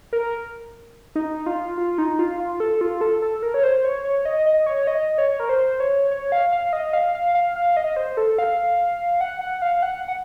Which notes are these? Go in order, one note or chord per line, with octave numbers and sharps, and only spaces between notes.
A#4
D#4
F4
F4
D#4
F4
F4
A4
F4
A4
A4
A#4
C#5
C5
C#5
C#5
D#5
D#5
C#5
D#5
C#5
A#4
C5
C#5
C#5
F5
F5
D#5
F5
F5
F5
F5
D#5
C5
A4
F5
F#5
F#5
F5
F#5
F#5